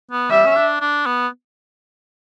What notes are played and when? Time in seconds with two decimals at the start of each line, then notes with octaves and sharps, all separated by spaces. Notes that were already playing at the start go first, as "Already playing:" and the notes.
0.12 B3
0.31 G3 E5
0.46 C#4
0.56 D4
0.81 D4
1.06 B3